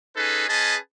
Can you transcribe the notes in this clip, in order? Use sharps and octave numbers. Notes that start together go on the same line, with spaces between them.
C#4 D#4 G#4 A4 B4
C#4 G#4 B4 D#5 A5